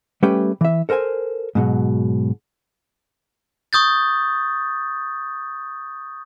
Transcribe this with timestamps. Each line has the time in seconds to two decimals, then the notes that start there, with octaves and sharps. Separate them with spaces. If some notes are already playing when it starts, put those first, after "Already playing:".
0.23 G3 A3 C#4 G4 B4 G5
0.61 E3 E5
0.89 A4 A#4 C5 G5 G#5
1.55 G#2 B2 F#3
3.73 C#6 D#6 G6 A6